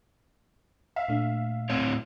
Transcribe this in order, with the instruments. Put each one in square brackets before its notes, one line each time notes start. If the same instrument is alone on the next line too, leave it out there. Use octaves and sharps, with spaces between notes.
[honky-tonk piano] E5 F5
[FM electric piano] A#2 A3 D4
[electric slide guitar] A2 C4 C#5